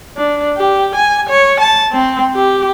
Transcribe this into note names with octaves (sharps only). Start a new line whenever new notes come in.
D4
G4
G#5
C#5
A5
C4
G4